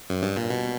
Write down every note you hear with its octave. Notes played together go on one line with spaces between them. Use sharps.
F#2
G2
A#2
B2